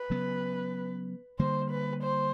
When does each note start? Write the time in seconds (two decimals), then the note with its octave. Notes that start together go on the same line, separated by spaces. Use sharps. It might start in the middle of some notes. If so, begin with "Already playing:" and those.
Already playing: B4
0.10 C#3 F#3 B3
1.39 D3 G3 A#3 C5
1.71 B4
2.03 C5